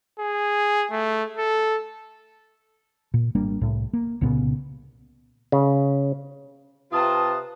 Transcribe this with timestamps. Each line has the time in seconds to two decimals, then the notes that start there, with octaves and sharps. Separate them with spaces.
0.20 G#4
0.91 A3
1.37 A4
3.14 A#2
3.35 G#1 G3 A#3 D4
3.61 C2 A2
3.93 A#3
4.21 C2 A#2 C#3 B3
5.52 C#3
6.92 C3 F4 B4 A5 D#6